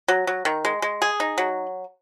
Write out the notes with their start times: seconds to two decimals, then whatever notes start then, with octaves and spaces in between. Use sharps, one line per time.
0.08 F#3
0.27 F#3
0.45 D#3
0.65 G#3
0.82 G#3
1.02 G#4
1.20 D#4
1.38 F#3